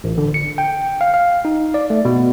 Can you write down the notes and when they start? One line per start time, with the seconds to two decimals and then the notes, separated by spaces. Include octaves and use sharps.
0.04 A1
0.18 D3
0.34 C#7
0.58 G5
1.01 F5
1.14 F5
1.45 D#4
1.74 D5
1.90 A3
2.05 B2